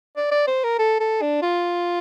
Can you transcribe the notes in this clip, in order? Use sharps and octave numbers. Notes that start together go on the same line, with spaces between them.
D5
D5
C5
A#4
A4
A4
D4
F4